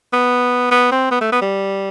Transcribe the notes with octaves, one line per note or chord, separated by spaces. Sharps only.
B3
B3
C4
B3
A3
B3
G3